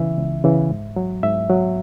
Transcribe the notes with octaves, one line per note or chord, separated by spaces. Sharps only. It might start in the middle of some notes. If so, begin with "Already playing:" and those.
Already playing: C#3 E3 E5
C#2
C#3 E3
G#2
F#3
G#2 E5
F#3